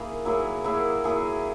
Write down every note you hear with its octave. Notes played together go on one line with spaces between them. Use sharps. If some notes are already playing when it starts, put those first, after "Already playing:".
Already playing: A#3 E4 G#4
F#3 A#3 E4 G#4
F#3 A#3 E4 G#4
F#3 A#3 E4 G#4